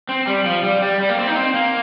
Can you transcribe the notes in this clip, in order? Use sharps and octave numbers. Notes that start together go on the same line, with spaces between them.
C4
G3
F3
G3
G3
G3
A#3
C4
D#4
C4
A#3